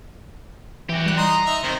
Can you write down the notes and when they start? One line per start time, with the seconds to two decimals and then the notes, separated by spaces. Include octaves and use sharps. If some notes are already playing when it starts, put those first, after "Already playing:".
0.89 E3 F#4 G4
1.06 G3 F#6
1.18 D#4 A#5 C6 D#6
1.46 D#4 D#5 E5
1.63 C3 D#3 C5